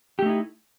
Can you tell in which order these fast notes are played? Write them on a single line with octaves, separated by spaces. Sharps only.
G4 A3 D#4 E4